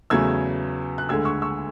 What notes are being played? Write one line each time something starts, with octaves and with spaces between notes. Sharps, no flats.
E2 C#3 F#3 A3 E6 G#6
F#6
D2 D3 G#3 E6 G#6
C#6 E6
C#6 E6